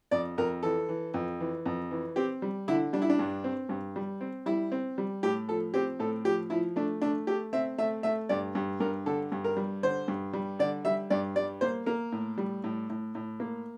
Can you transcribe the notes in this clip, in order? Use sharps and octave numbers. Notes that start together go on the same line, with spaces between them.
F2 D5
F2 A#4
E3 A4
E3
F2
E3
F2
E3
C4 G4
G3
D3 E4
G3 D4
E4
D4
G2
C4
G2
G3
C4
G3 E4
C4
G3
A2 G4
F3 A4
C4 G4
A2 A4
F3 G4
F3 E4
A3 D4
A3 D4
A3 G4
C4 E5
A3 E5
A3 E5
G2 D5
G2
G2 A#4
D3 A4
G2
A#4
G3
D3 C5
G2
G3
D3 D5
G3 E5
G2 D5
G3 D5
A#3 C5
A#3 A#4
A2
G3
A2
A2
A2
A#3